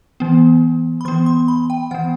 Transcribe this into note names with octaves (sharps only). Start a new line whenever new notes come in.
E3 B3
B5
E3 B3 C6
C6
B5
G5
E3 B3 F#5